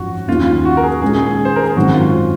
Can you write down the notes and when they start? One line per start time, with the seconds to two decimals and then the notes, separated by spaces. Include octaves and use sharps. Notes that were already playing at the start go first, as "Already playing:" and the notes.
Already playing: G#1 F#2 F3 F#4
0.28 D#2 D#3 A#3 C#4 F4
0.47 F4
0.65 F#4
0.77 A#4
0.83 G#4
1.01 A#2 G#3 C#4 G#4
1.15 G#4
1.26 G#4
1.45 C5
1.56 A#4
1.65 G#4
1.76 G#1 F#2 D#3 G#3 C4 F#4
1.94 F4